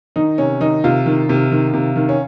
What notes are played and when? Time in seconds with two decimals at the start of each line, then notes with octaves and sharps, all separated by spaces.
0.16 D#3 D#4
0.38 C3 C#4
0.60 D#3 D#4
0.84 C3 F4
1.06 D#3
1.29 C3
1.52 D#3
1.74 C3
1.96 D#3
2.09 C#4